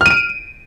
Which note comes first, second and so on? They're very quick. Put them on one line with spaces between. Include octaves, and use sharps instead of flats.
F6 D#7 D7